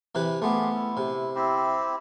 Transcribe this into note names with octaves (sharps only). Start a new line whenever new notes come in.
C3 E3 B4
A3 B3 F4 G4 G#4
E4
C3
C4 E4 G4